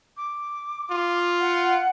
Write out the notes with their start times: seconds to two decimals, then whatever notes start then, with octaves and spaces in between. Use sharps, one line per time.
0.17 D6
0.91 F4
1.40 F#5